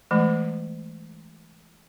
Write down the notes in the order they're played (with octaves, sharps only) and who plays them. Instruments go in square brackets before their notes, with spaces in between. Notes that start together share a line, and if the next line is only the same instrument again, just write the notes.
[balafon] E3 G#3 A3